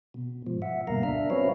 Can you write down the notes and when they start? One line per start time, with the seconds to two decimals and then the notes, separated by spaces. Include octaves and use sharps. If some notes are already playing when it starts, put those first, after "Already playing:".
0.14 B2
0.47 G#2 F3
0.62 E5 F#5
0.87 D2 G2 B2 A#3 F5 A#5
1.03 D4 E5 F6
1.30 F#3 C4 C#4 B4 C#5 F5